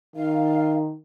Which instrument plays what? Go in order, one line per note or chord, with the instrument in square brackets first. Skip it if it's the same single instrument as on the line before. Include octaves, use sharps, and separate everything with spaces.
[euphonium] D#3 [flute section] F5